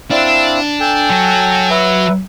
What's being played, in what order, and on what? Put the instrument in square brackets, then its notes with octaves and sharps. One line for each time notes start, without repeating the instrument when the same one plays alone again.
[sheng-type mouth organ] C4 E4 F5 [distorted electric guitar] D4
[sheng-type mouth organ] A4 G5 G#5
[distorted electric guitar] F#3
[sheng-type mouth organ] B4 E5